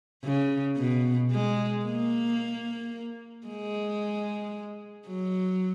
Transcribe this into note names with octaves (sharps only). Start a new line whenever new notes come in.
C#3
B2
G#3
A#3
G#3
F#3